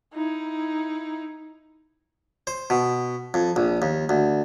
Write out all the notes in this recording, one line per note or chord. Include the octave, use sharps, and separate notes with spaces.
D#4 E4
C5
B2
F2
A#1
D#2
D2